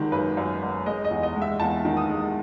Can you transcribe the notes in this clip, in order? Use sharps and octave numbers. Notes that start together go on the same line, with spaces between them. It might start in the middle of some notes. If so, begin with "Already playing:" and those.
Already playing: G#1 D#3 G#3
F#2 B4
F#2
G#1
G#3 D#5
D#5
E2
D#5
G#3
E5
E2 A5
D#3
D#6
G#3